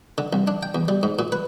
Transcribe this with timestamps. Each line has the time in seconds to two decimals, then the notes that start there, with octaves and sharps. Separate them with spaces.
0.18 D3
0.33 C2
0.47 D4
0.63 G5
0.75 E2
0.88 G3
1.03 G#2
1.19 A#2
1.32 B4